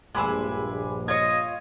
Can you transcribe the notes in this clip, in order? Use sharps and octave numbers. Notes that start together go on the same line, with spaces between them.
A#1 G2 G#3 E5 G#5 B5 D6
F4 C#5 D#5 G#6